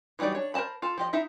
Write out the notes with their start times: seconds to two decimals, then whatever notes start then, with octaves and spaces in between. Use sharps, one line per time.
0.19 E3 F#3 G3 D#4 D5
0.35 D4 C#5
0.54 A#4 C5 D#5 A5 B5
0.82 F4 A4
0.98 F3 G4 D#5
1.13 D#4 E4 E5